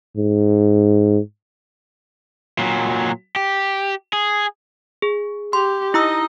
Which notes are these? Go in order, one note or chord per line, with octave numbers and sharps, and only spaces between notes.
G#2
A#2 F#3
G4
G#4
G#4
G4 C6
D#4 E4 D#5 A#5 E6